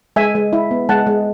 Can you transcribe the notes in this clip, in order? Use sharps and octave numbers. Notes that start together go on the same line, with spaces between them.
G#3 E5 G#5
G#3
E4
B3
G#3 F#5 A5
G#3